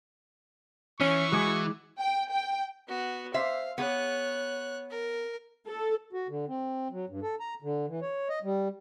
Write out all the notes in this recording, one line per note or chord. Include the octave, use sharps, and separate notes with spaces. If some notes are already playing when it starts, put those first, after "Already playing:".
E3 C#4 C#6 C7
G#3 F#4 G#4 D6
G5
G5
B3 F#4
C5 E5 F5
B3 G#4 C#5 F#6
A#4
A4
F#4
D3
C4
F#3
G2
A4
A#5
D3
E3
C#5
D#5
G3